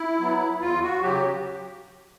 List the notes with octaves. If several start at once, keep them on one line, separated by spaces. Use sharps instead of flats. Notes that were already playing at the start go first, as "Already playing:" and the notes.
Already playing: E4
F#3 B3
E2 F4
F#4
C#3 F#3 G4